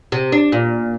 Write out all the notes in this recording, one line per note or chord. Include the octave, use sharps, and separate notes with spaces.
C3
D4
A#2